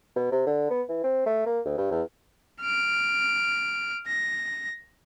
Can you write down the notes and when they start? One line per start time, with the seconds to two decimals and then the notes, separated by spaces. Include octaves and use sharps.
0.16 B2
0.32 C3
0.46 D3
0.71 B3
0.89 E3
1.04 C4
1.26 A3
1.46 A#3
1.66 D2
1.78 G2
1.91 E2
2.62 F6 D7
4.07 A#6